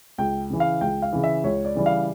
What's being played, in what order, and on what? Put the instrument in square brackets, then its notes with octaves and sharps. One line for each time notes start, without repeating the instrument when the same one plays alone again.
[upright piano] C#2 G5
C#3 E3
F5
C#2 G5
F5
C#3 E3
E5
C#2 C#5
D5
C#3 E3 G3
F5